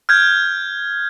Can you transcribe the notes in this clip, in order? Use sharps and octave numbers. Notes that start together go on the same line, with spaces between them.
F6 G6 G#6